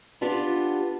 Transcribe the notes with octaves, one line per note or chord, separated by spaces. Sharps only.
B3 D4 F4 G4